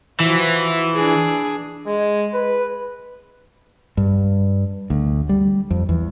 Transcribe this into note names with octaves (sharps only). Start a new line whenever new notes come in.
E3 F3 E4 F#4
D4 G#4
G#3
B4
G2
D2
G3
F2
E2